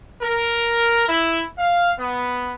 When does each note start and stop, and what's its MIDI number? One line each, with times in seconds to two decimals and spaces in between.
0.21 1.06 70
1.08 1.42 64
1.58 1.90 77
1.98 2.52 59